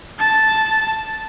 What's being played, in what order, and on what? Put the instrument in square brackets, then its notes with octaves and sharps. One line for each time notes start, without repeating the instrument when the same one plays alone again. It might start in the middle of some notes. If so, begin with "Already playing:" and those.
[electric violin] A5